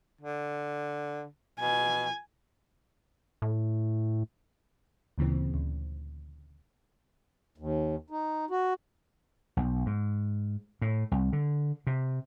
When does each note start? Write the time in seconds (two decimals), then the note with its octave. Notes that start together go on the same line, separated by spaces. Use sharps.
0.21 D3
1.60 B2 G#5
3.42 A2
5.18 D2 A#2 C#3 E3 C4
5.54 D2
7.58 D#2
8.10 D#4
8.50 F#4
9.57 B1
9.86 G#2
10.82 A2
11.12 C2
11.33 D3
11.87 C3